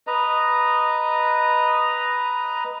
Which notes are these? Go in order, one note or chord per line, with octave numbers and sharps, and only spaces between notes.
B4 D#5 A#5